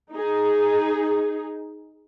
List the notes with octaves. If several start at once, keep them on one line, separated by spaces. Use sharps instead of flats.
D#4 G#4